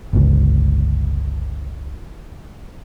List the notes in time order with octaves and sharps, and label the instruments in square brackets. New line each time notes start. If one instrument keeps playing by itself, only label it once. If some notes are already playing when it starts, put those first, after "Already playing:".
[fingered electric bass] G1 C#2